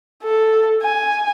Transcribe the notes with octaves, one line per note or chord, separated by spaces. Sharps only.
A4
G#5